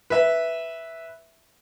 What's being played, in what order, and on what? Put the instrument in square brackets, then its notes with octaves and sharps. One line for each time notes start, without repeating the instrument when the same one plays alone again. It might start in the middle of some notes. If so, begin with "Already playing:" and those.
[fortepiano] B4 E5